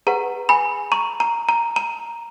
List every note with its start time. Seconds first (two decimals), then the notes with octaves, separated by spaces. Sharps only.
0.07 G#4 B4 F#5 A#5
0.49 G#5 B5
0.92 A#5 C#6
1.20 A#5
1.49 A#5
1.76 A#5